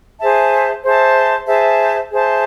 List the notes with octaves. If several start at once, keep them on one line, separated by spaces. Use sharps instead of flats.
G#4 C5 E5 A5
G#4 C5 E5 A5
G#4 C5 E5 A5
G#4 C5 E5 A5